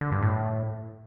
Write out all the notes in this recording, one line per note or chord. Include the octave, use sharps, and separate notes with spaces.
D3
G2
A2